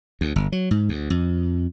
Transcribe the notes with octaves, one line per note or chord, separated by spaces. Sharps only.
D2
G1
F#3
G#2
D2
F2